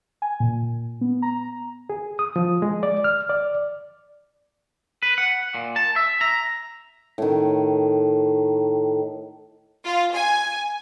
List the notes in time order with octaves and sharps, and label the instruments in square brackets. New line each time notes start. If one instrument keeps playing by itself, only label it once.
[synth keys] G#5
A#2
B3
A#5
[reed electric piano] G#4
D#6
F3
G#3
D5
F6
D5
[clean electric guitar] B4
F#5
A#2
A5
E5
A#5
[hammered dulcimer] A2 D#3
[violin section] F4
G#5